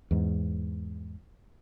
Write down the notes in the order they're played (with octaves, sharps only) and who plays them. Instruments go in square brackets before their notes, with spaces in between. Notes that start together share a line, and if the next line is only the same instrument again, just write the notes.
[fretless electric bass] E2 G#2